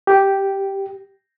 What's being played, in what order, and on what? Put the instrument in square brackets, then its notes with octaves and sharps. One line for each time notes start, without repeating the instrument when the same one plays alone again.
[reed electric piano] G4